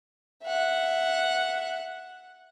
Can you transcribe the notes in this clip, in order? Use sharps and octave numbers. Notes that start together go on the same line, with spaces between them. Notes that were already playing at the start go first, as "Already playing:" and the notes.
E5 F#5